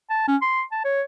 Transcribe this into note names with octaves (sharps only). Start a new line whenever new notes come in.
A5
C#4
C6
A5
C#5